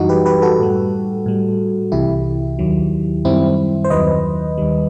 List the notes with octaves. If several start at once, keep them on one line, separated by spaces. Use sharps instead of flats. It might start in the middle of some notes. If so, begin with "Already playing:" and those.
Already playing: F#2 E3 G3 D#4 F#4
G4 B4
G4 B4
F#4 A4
A2 G3
A2 G3
C2 C3 E3 E4 G4
D#2 D#3 F#3
F#2 D#3 G3 C4 E4
C5
D#2 D#3 F#3 B4 D#5
D#2 D#3 G3